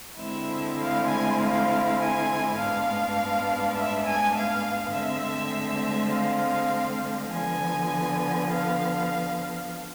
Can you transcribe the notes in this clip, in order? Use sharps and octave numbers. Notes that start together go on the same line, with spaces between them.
D3 G#3 C4 E4 E5
F5
G#5
F5
G#5
G#2 G#3 B3 D4 F5
E5
G#5
F5
D3 G#3 C4 E5
F5
D3 F3 B3 G#5
F5